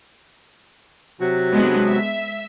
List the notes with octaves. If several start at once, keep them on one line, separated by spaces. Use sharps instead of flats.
C3 F#3 F#4
G#3 B3 D4
E5